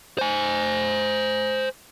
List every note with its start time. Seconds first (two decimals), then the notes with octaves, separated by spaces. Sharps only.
0.18 C5 G#5